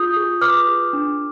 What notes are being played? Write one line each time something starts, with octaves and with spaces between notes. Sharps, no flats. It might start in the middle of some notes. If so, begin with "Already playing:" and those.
Already playing: F4 G#4 D#6 G6
G#4
B4 D6 F6
G#4
D4